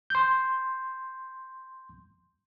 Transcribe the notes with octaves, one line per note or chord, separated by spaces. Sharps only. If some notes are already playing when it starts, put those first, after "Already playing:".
C6 G6